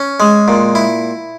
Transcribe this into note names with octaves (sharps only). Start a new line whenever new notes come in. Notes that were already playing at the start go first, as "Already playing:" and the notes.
Already playing: C#4
G#3
A#2
E4